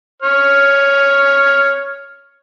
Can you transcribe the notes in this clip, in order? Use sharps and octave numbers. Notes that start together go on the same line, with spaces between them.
C#5 F6